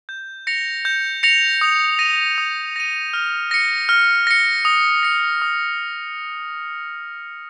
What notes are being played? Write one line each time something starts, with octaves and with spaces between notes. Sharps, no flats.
G6
A#6 C#7 F7
G6
A#6 C#7 F7
D#6
A#6 D#7
D#6
A#6 D#7
F6
A#6 C#7
F6
A#6 C#7
D#6
A#6 C#7
D#6